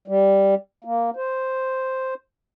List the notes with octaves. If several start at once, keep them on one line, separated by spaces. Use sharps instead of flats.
G3
A#3
C5